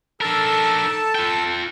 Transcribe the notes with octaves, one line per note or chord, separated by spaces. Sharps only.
D4 A4 A#4 A5
F4 G5